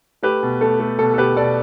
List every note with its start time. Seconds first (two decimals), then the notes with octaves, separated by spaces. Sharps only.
0.23 A3 G4 B4
0.43 B2
0.61 A3 A4
0.80 A3
0.99 B2 A4
1.14 A4
1.18 B2 G4 B4
1.36 B2 A4 D5